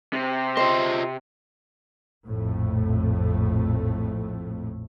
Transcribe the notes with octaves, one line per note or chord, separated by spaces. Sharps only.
C3
F4 G#4 C5 D#5
A#1 F2 A2 A3